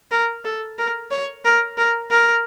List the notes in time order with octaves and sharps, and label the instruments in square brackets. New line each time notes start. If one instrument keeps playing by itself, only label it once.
[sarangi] A#4
A4
A#4
C#5
A#4
A#4
A#4